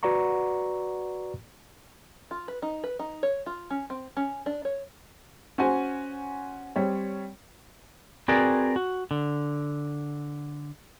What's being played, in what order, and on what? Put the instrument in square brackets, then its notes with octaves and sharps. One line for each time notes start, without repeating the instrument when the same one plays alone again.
[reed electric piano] F#4 B4 D5 F#5 A#5 C#6
[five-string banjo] F4
B4
D#4
B4
D#4
C#5
F4
C#4
C4
C#4
D4
C#5
[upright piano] C#4 F#4 C5 G#5
G3 C4 C#5
[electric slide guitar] C4 F#4 G#4 A#4 B4 D5
F#4
D3